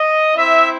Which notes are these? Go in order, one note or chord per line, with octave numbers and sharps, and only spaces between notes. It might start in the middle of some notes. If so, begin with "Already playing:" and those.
Already playing: D#5
C4 E4 E5